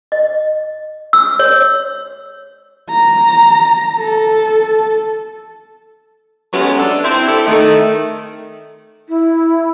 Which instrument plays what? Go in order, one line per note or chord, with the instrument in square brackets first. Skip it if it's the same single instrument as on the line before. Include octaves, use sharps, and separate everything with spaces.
[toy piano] D#5
E6
C#5
[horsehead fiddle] A#5
A4
[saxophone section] F#3 G#3 A3 B3 C#4 G4
D4 A4
C4 E4
C4 E4 G4 A4
D#3 A3
[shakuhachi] E4